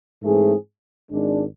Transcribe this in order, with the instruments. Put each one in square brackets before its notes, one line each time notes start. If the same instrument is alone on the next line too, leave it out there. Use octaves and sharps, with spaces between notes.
[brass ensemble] G#2 E3 A3 C4 G#4
G#1 G#2 G#3 D4